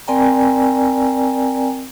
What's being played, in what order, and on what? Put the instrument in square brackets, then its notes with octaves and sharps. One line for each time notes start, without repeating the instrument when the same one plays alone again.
[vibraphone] C4 A#4 D5 G5 G#5 A#5